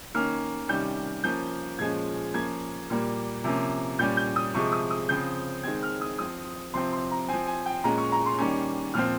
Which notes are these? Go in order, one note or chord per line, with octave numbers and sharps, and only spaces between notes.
D#3 A#3 C#4 F6
C3 D#3 G3 C#4 G6
F3 A#3 C#4 G6
A#2 F3 G#3 C#4 G#6
F3 A#3 C#4 G#6
A#2 G3 A#3
C3 F3 A#3 C#4
A#2 G3 C#4 G6
G6
D#6
C3 F3 G#3 C#6
D#6
D#6
C#3 F3 C4 G6
D#3 G#3 C4 G#6
F6
D#6
F3 C4 D#6
C3 F3 C4 C6
C6
A#5
F3 C4 G#5
G#5
G5
A#2 G#3 C#4 A#5
C#6
A#5
C6
D#3 G3 A#3 C#4 C#6
A#2 F3 C4 F6